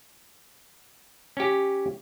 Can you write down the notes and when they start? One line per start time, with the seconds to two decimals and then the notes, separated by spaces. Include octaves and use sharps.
1.37 C#4 G4